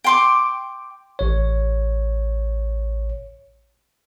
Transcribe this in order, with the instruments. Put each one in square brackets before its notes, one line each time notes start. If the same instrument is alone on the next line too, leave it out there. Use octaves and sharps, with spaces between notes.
[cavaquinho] G5 C6 D6
[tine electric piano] A1 C#5